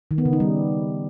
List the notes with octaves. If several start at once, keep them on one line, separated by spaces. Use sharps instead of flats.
D#3
B3
C#3
D#4
G3